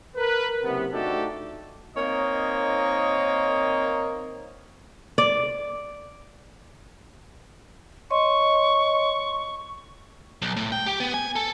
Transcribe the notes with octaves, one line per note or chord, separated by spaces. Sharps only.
A#4 B4
F#1 C3 B3
A3 D4 D#4 F#4 G4 A4
A#3 C4 D#4 C#5 D#5 F5
D5
C#5 D#5 C6 C#6
B1
A2
G5
G4
B3
G#5
A4